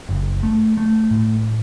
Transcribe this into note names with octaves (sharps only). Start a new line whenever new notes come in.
F#1
A3
A3
A2